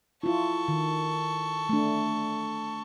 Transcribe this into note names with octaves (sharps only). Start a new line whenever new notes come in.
E4 F4 A4 C#6
D#3
A3 D4